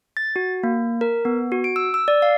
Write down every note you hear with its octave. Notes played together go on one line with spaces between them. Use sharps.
A6
F#4
A#3
A#4
B3
F#4
D7
E6
E6
D5
F5